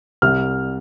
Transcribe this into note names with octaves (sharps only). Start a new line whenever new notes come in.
C2 F6